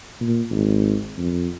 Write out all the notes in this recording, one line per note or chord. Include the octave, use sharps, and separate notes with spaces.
A#2
G#1
F2